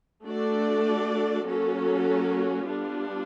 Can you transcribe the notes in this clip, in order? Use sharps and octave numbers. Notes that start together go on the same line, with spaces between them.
A3 D4 F#4 A4 D5
F#3 A#3 C#4 F#4 A4
G3 B3 D4 F4